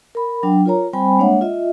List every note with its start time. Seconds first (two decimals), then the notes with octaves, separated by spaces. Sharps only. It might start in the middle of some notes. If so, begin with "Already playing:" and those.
0.15 A#4 B5
0.43 F#3 D4 G5
0.66 F4 A#4 C#5 A#5
0.93 G3 C4 C5 G5 G#5 B5
1.18 G#3 A#3 D4 C#5 E5 F#5
1.41 F4 D#5 E5